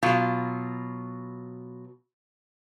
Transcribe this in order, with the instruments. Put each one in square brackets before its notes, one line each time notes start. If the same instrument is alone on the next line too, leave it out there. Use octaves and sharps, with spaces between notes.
[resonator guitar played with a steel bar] B2 F#3 F4